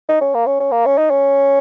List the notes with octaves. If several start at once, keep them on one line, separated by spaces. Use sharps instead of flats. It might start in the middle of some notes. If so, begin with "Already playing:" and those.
D#4
C#4
A#3
C#4
C#4
A#3
C#4
D#4
C#4